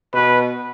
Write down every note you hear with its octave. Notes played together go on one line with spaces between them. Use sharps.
B2 B4